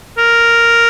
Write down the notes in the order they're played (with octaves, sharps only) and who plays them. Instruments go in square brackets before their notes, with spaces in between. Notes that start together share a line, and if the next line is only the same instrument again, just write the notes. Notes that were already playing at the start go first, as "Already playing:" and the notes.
[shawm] A#4